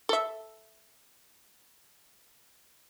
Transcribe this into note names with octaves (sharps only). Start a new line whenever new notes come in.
A4 E5